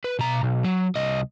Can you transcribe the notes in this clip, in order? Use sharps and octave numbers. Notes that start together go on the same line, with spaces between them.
B4
B2 A#5
B1
F#3
C2 D#5